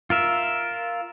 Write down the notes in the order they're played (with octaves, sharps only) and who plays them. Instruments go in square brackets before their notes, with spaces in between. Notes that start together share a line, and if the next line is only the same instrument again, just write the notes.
[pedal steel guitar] F4 A#4 E5